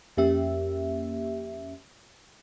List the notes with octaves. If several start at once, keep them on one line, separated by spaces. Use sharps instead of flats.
F2 A#3 C#4 G4 E5